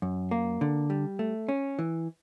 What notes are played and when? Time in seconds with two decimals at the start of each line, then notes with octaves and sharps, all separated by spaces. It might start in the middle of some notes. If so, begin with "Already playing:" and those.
0.02 F#2
0.31 A#3
0.61 D3
0.90 G3
1.19 A3
1.49 C#4
1.79 E3